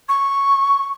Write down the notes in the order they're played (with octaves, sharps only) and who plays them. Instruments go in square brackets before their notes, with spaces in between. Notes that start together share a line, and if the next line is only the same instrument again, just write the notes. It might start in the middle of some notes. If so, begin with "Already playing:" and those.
[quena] C#6